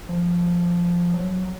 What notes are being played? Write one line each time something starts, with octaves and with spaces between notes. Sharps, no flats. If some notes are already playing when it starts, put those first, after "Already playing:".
F3
F#3